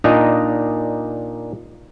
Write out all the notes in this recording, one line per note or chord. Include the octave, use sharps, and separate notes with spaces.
A#2 D4 D#4 D#5 A#5